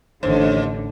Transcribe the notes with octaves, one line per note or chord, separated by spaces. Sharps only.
A1 D#2 D3 C5